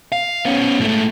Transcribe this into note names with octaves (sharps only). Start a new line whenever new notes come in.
F5
B3 C#4
G#2 A3